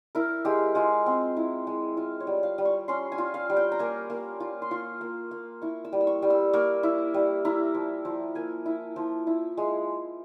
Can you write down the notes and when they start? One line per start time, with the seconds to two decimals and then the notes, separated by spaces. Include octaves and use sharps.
0.15 E4 A#4
0.45 G#3 G4
0.75 G#3 F4
1.06 C4
1.37 E4
1.67 G#3
1.97 F4 E5
2.20 C#5
2.27 G3
2.43 F5
2.58 G3
2.65 C#6
2.88 C#4 C6
3.12 G#5
3.18 F4
3.34 F5
3.50 G3
3.57 G5
3.72 A#5
3.79 A#3 G#5
4.10 A#3
4.40 F4
4.62 C6
4.71 F4 C#6
5.01 A#3
5.31 A#3
5.62 E4 C#6
5.85 E6
5.93 G3
6.01 E6
6.07 C#6
6.22 G3
6.30 E6
6.53 A#3 C#6
6.83 E4
7.14 G3
7.45 E4 A#5
7.75 F3
8.05 F3
8.35 A#3 G#5
8.66 E4
8.96 F3
9.27 E4
9.57 G#3